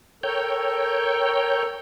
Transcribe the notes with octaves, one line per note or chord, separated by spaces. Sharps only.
A4 A#4 C#5 G5